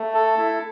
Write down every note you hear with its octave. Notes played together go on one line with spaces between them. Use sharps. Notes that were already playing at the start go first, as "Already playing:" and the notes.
Already playing: A3
A4
E4